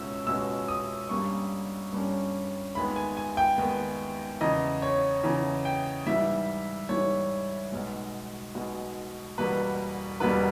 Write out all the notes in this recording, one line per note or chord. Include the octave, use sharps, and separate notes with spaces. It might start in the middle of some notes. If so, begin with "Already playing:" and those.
Already playing: C#2 B2 G#3 C#4 E6
C#2 B2 G#3 C#4 E6
D#6
G2 G3 A#3 C#4 C#6
G2 G3 A#3 C#4
D#2 D#3 G#3 B3 B5
G#5
G#5
G5
D#2 D#3 G#3 B3
E2 C#3 E3 D#5
C#5
E2 C#3 E3
G5
G#2 E3 G3 E5
G#2 E3 G3 C#5
B1 B2 G#3
B1 B2 G#3
E1 E2 B2 G3 A#3 B4
E1 E2 B2 G3 A#3 B4